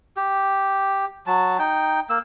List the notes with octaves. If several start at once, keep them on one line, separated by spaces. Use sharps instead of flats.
G4
F#3 A5
D#4 G5
A#3 E6